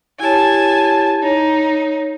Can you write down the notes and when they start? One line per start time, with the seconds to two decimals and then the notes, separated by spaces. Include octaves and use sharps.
0.20 E4 G4 C#5 G#5 A5
1.23 D#4 C#5